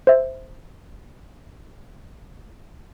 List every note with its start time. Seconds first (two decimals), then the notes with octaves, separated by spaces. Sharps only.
0.07 C5 E5